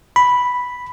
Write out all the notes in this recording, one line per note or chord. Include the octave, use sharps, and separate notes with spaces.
B5